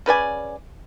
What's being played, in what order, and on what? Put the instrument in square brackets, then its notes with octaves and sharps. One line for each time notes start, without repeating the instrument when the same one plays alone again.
[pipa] C#3 B4 D5 G#5